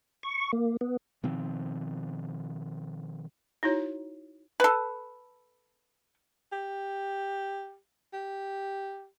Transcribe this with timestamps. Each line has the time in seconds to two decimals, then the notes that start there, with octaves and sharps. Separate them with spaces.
0.23 C#6
0.53 A#3
0.81 B3
1.23 B2 D#3 F3 C4
3.63 D#4 E4 F#4 C#5
4.60 A4 B4
6.52 G4
8.13 G4